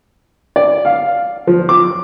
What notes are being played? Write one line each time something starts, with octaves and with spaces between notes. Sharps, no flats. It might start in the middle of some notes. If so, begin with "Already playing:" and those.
D5
F5
F3
D6